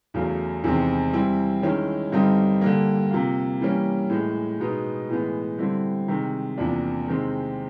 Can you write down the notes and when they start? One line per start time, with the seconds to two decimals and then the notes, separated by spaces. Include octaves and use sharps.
0.14 E2 C#3 F#3 A3
0.64 E2 C3 D#3 G#3 C4
1.13 E3 G3 C4 E4
1.62 D#3 G#3 C#4 E4
2.12 G2 D3 G3 C4 D#4
2.61 D3 G3 A#3
3.11 C3 F3 A#3
3.61 E3 G3 A#3 C#4
4.10 A2 E3 G#3
4.60 B2 G#3 B3 D#4
5.09 A2 E3 G#3 B3
5.58 D3 G3 C4 E4
6.08 C3 D#3 G#3
6.58 E2 C3 F3 A#3 D4
7.08 C3 D#3 G#3 C4